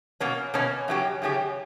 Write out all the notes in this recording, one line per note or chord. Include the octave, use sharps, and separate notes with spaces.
B2 A#3 C#4
B2 A#3 C#4
F#2 C#3 F#3 C#4 G4
F#2 C#3 F#3 C#4 G4